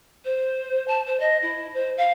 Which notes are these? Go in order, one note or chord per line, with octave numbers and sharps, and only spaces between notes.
C5
A5
C5
D#5
E4
C5
F5